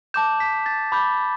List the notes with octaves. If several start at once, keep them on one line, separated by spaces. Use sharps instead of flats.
A5 D6 G6 E7
B6
A6
B5 D6 G6